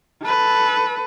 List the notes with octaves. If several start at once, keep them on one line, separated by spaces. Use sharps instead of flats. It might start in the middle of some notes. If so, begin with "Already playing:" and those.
A4 B4